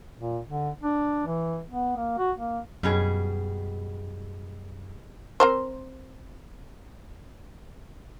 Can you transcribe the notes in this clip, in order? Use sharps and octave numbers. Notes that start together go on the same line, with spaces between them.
A#2
D3
D4
E3
B3
A#3
F#4
A#3
F#2 B2 G3 G#4
C4 A#4 C5